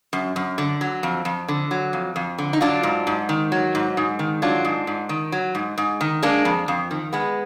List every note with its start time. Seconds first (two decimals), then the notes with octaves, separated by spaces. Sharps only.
0.13 F#2
0.36 F#2
0.58 D3
0.81 F#3
1.03 F2
1.25 F2
1.48 D3
1.71 F#3
1.93 F2
2.16 F2
2.38 D3
2.53 D#4
2.61 F#3 D4 F4
2.83 G#2
3.07 G#2
3.29 D#3
3.52 F#3
3.75 G#2
3.97 G#2
4.19 D#3
4.42 F#3 D4 F4
4.65 G#2
4.87 G#2
5.09 D#3
5.32 F#3
5.55 G#2
5.78 G#2
6.01 D#3
6.22 G#3 A#3 D4
6.45 F2
6.68 F2
6.91 D#3
7.13 G#3 B3